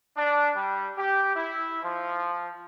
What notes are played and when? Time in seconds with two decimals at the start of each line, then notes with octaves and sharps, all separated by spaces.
0.16 D4
0.55 G3
0.97 G4
1.35 E4
1.83 F3